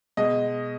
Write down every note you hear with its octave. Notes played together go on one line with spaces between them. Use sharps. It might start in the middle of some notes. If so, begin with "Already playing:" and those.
B2 G#3 D#5